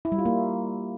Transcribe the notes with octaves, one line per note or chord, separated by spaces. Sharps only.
E4
G3
F4
A#3